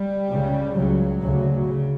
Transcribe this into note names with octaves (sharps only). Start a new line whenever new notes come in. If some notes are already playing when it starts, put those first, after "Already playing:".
Already playing: G3
C#2 C#3
C#2 C#3 F#3
D2 C#3
C#3